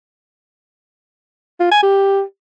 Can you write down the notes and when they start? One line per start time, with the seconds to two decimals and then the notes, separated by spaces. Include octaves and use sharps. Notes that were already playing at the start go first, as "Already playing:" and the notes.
1.60 F4
1.71 G#5
1.83 G4